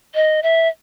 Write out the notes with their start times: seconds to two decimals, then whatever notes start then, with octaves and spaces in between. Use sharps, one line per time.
0.15 D#5
0.43 E5